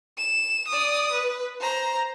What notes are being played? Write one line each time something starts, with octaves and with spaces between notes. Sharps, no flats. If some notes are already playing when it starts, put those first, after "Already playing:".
E7
D5 D#6
B4
C5 A#5